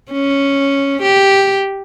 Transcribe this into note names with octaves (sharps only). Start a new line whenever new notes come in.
C#4
G4